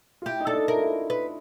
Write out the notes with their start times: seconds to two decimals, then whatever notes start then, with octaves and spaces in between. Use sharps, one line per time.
0.22 F4
0.26 E4 G4
0.40 D#4
0.47 D4 A4
0.53 D#4
0.68 E4 A#4
0.75 F4
0.82 E4
1.10 B4